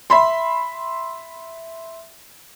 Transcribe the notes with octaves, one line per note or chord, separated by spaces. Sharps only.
E5 B5 C6